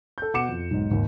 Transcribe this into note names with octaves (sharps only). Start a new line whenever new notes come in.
A4 G6
B2 F#5 D6 C#7 E7
F2
B1 G#2
G#1 D#2